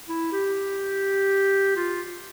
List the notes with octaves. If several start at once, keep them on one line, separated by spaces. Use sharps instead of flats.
E4
G4
F4